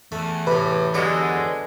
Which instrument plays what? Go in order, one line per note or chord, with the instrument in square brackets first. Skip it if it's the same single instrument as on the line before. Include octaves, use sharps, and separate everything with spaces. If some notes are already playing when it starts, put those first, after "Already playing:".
[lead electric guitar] E2 [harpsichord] A3
[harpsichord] A2 C3 [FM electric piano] B4
[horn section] D3 G#3 [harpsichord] F#3 G4 A#5